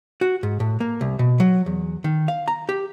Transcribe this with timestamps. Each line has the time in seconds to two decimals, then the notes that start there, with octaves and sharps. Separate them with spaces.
0.21 F#4
0.43 G#2
0.60 A2
0.80 A#3
1.01 C2
1.19 B2
1.40 F#3
1.66 E2
2.04 D#3
2.28 F5
2.48 A#5
2.69 G4